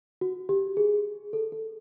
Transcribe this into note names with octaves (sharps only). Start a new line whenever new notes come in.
F#4
G4
G#4
A4
A4